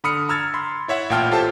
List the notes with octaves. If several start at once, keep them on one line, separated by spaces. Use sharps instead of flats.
D3 B5 D#6 F6 C#7
A#5 E6 F6 G#6 A6
B5 C6
E4 C#5 E5 F#5
A1 A#2 F5 G5 A5 F6
F4 G4 A4 C5 A5